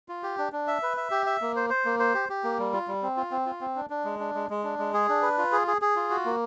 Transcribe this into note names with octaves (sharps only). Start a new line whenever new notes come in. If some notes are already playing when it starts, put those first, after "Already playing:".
F4
G4
D4
D4
E5
B4
E5
G4
E5
A#3
C5
C5
A#3
C5
G4
G4
A#3
G3
F4
G3
C4
F4
C4
F4
C4
D4
D4
G#3
D4
G#3
G#3
D4
G#3
G#4
D4
B4
F4
G#4
G#4
G#4
F4
F#4
A#3